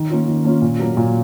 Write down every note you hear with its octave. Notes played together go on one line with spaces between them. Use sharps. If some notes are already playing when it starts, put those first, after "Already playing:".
Already playing: D#3
A#3 C#4 F4
D#3
A#3 C#4 F4
A#2
F#3 A#3
A#2